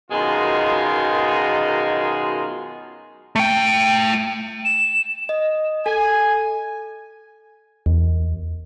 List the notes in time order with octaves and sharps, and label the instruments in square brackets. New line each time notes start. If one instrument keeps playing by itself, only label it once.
[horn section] F#2 B2 D#3 G#3 F4
[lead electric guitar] A3 G5
[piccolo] E7
[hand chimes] D#5
[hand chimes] A4 [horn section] G#5
[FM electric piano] E2